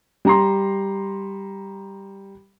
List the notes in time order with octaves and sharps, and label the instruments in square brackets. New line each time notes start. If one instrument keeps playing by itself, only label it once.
[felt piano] G3 A#5 C6